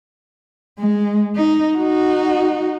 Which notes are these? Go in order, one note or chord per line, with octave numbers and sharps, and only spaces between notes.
G#3
D#4
D#4 F#4